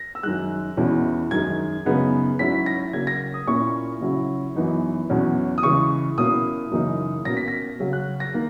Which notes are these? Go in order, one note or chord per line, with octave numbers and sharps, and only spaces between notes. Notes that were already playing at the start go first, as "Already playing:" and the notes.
Already playing: A#6
E6
F#2 D#3 G#3 F#6
E2 B2 G#3 C#4 E4
F#2 D#3 G#3 G#6
F#2 C#3 G#3 B3 D#4
G#2 F#3 C#4 E4 B6
A#6
C#3 F#3 A#3 G#6
A#6
D#6
A#2 A#3 C#4 E4 C#6
C#3 F#3 C#4 E4
F#2 E3 B3 D#4
E2 B2 F#3 C#4
D#6
C#3 E3 G#3 C#6
B2 A#3 C#4 E4 D#6
F#2 C#3 E3 A#3 D#4
B2 A#3 C#4 A#6
B6
A#6
C#3 F#3 C#4
F#6
A#6
D#3 A#3